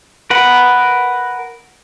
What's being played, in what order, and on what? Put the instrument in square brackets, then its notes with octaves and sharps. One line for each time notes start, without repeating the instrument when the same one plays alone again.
[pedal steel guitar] A#4 B4 F#5